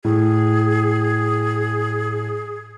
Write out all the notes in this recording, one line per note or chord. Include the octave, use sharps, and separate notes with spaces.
A2 G#4